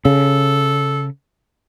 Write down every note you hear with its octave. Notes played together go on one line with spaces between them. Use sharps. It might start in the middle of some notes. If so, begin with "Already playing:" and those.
C#3 A4